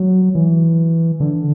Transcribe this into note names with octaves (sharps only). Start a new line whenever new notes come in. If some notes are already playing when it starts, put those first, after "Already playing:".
Already playing: F#3
E3
D3